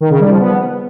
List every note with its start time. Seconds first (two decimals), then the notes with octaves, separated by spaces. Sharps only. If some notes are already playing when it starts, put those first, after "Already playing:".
0.01 D#3
0.10 C#3
0.20 G3
0.30 F3
0.39 B3